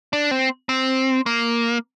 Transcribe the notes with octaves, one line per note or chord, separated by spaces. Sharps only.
D4
C4
C4
A#3